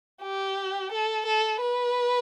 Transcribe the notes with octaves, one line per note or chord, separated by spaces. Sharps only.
G4
A4
A4
B4